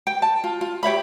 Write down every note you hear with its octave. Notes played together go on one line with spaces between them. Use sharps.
G5
A5
F4
F4
G4 C#5 E5 B5